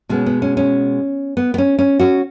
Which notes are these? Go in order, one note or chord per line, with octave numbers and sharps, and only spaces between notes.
B2 G#3 B3 C#4
B3
C#4
C#4
B3
B3
C#4
C#4
C#4 F#4